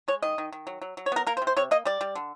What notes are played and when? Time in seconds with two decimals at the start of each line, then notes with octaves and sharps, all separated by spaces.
0.08 G#3 C#5
0.22 D#3 D#5
0.38 D#3
0.52 D#3
0.67 F#3
0.82 F#3
0.97 F#3
1.06 C#5
1.12 B3 A#4
1.27 A#3 A#4
1.37 C5
1.42 C3
1.47 C5
1.57 C3 C#5
1.71 A#3 D#5
1.85 G3 D5
2.01 G3
2.15 D3